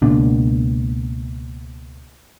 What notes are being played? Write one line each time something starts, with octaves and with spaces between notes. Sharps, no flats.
C#2 B2 A#3 D4